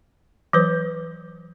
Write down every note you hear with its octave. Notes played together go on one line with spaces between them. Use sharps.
E3 F#3 B4 C5